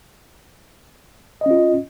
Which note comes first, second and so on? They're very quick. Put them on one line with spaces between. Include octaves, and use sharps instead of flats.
D#5 C#4 F4